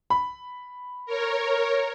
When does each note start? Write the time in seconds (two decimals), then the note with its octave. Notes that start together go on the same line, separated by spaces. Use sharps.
0.10 B5
1.06 A#4 C#5